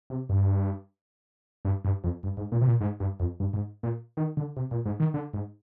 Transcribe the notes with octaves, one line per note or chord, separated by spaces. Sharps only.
C3
G2
G2
G2
F2
G2
G#2
A#2
C3
A#2
G#2
G2
F2
G2
G#2
A#2
D#3
D3
C3
A#2
G#2
D#3
D3
G#2